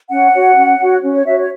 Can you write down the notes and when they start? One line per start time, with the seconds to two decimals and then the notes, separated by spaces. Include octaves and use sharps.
0.09 C#4 F#5
0.33 F#4 C#5
0.56 C#4
0.80 F#4 C#5
1.03 C#4
1.15 C#5
1.26 F#4 C#5 E5
1.38 C#5